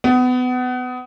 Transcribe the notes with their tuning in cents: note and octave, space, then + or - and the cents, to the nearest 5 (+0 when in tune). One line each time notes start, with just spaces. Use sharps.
B3 +25